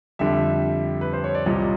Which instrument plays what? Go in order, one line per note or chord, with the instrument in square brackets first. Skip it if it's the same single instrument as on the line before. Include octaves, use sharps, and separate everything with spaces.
[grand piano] F2 D3 G3 E5
B4
C5
C#5
D5
C2 A#2 G3 D#5